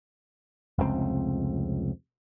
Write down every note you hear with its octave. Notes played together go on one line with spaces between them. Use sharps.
F1 C#2 A#2 C4